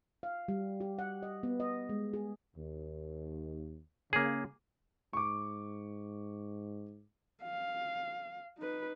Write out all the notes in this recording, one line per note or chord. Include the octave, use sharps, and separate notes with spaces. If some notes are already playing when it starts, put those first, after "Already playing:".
F5
G3
G4
F#5
D#5
B3
D#5
G#3
G#4
D#2
C#3 A#3 G#4
G#2 C#6 D6
F5
D#4 B4